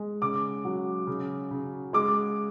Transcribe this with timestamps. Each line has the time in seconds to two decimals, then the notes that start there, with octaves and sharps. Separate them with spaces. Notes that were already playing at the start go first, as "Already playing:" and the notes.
Already playing: G#3
0.22 C#3 D6
0.65 F#3
1.07 C#3
1.51 C#3
1.93 G#3 D6